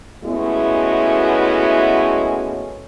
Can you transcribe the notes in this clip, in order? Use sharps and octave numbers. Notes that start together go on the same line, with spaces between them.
G#3 A3 B3 C#4 E4 F#4